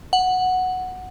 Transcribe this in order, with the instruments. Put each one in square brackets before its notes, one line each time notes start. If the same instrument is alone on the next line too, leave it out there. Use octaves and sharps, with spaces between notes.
[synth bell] F#5